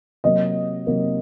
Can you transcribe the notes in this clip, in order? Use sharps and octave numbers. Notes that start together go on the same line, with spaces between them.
C3 F#3 A#3 D#5
C3 F#3 A#3